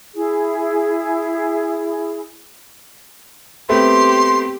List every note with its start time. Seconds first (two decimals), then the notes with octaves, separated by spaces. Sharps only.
0.15 E4 G#4
3.69 A3 B3 C4 G4 C6